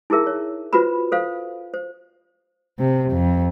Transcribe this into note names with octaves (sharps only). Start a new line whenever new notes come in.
D#4 E4 G#4 A#4 E5
C#5
F4 F#4 B4 C5 B5
A4 C5 F5
C5
C3
F2